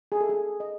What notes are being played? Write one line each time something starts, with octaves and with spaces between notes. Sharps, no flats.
G#4
A4
G#4
D#5